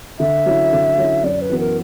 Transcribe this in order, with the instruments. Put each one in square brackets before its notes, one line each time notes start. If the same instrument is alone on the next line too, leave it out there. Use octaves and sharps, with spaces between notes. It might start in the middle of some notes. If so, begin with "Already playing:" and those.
[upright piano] D3 [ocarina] E5
[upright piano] F#3 C#4 E4
D3
F#3 C#4 E4
[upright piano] F#2 [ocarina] D5
[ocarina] B4
[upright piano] E3 B3 F#4
[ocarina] A#4